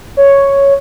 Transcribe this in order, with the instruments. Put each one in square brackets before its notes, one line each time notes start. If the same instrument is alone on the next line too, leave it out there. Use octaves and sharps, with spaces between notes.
[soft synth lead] C#5